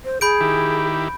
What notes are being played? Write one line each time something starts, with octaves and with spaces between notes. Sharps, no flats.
C5
G#4 B5 G6 D7
D#3 E4 G4